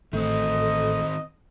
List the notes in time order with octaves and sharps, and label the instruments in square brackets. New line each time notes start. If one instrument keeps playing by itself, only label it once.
[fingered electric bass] A1 A3 [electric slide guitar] D#3 C4 [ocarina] A4 [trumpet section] D#5